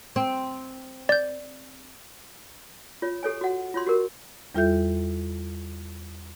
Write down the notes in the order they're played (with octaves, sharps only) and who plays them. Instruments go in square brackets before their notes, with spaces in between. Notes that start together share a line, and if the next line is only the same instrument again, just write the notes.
[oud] C4
[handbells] D5 G6
[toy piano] F4 C#5
G4 A4 C#5 G#5
F#4 F#5
F4 C#5 C6
F#4 G4 A#4
[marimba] E2 G3 F4 A4 E5 G6